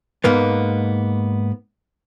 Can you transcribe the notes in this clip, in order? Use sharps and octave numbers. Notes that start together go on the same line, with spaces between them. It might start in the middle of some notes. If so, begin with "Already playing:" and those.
G#2 A#3 B3